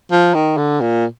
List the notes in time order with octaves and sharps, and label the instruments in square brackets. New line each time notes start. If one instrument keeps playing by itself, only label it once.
[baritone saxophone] F3
D#3
D3
A#2